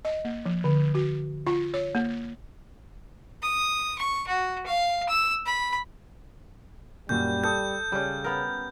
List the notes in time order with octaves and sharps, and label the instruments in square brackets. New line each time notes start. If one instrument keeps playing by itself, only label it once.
[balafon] D#5
A#3
F3
D3
F#4
F4
C#5
A#3
[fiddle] D#6
C#6
F#4
F5
E6
B5
[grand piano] F#2 A#2 [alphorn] G3 [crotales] G6
[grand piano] A4 D#6 [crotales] G6
[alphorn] C#3 [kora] G3 C#4
[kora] B3 A#4